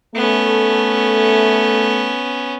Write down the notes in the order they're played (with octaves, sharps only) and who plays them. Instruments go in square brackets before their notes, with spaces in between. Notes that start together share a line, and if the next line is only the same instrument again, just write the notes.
[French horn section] A3 A4 [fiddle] B3 C#4